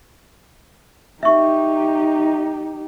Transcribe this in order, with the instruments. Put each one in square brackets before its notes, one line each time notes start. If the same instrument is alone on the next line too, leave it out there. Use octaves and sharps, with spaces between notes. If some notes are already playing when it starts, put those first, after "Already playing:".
[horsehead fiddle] D#4 G4 [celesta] E5 C#6